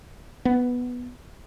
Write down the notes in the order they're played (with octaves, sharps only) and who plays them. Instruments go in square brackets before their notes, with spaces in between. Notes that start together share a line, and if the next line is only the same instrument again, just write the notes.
[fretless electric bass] B3